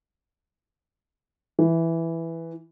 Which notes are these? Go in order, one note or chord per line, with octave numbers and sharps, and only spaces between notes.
E3